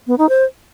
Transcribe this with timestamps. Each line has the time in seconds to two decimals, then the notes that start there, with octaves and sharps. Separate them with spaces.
0.07 B3
0.18 D#4
0.29 C5